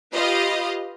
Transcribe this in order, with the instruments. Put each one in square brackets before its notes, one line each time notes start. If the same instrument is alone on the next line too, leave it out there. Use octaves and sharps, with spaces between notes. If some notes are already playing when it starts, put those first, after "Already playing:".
[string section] F4 G4 B4 D#5 F5